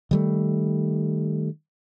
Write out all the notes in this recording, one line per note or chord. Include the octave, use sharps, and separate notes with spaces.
D#3 G3 A3